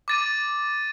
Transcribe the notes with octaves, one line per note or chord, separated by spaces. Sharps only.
D6 A6 D#7